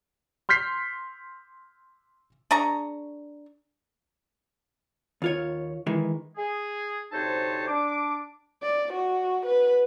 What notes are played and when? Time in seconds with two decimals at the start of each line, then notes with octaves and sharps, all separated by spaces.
0.49 C6 F6 G6 B6 C7
2.51 D4 G#4 A#5 C#6
5.22 D#2 F4 C#5
5.87 D#3 E3 G#3
6.37 G#4
7.12 D2 C3 D#4 C5 C#5 A5
7.68 D4 D6
8.63 D5
8.93 F#4
9.46 B4